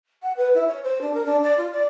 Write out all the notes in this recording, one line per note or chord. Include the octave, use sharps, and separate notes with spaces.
F#5
B4
E4
C#5
C5
D4
A#4
D4
D5
F4
D5